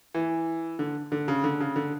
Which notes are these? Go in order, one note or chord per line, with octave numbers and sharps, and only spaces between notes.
E3
D3
D3
C#3
D3
C#3
D3